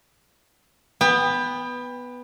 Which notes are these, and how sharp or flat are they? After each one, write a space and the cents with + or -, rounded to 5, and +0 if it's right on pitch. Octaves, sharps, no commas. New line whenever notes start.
B3 +0 G5 +30